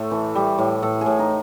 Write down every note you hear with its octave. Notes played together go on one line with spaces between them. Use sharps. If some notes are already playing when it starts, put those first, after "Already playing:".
Already playing: A2 A3 C5
E3
G3
A2
A2 A4
A2 G#4
D#4